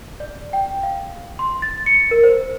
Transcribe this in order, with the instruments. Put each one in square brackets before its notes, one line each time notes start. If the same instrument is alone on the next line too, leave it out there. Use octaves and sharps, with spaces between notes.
[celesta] D5
G5
F5
C6
A6
C#7
A#4
C5